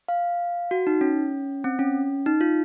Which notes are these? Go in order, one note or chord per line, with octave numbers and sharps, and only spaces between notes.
F5
F#4
D#4
C#4
C4
C#4
D#4
F4